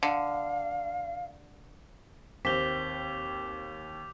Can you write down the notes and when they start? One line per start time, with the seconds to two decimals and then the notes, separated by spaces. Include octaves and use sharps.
0.03 D3 F5
2.45 D#2 C4 D6 G6 B6 F7 G7